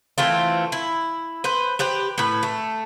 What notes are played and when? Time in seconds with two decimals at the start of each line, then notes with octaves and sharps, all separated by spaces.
0.18 E3 A3 C4 F4
0.72 E4
1.44 B4 C5
1.79 G4 B4 C5
2.18 A2 B4
2.43 A3